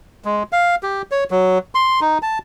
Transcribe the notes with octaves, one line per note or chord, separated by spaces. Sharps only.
G#3
F5
G4
C#5
F#3
C6
D#4
A5